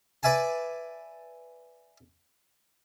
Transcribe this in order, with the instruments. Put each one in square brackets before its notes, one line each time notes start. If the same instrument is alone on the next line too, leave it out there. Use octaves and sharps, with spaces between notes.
[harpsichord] B4 D5 E5 G#5 A5